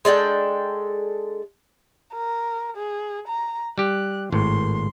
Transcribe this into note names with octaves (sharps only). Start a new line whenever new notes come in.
G#3 D4 A4 G5
A#4
G#4
A#5
G3 G4 F#6
G#1 A2 C6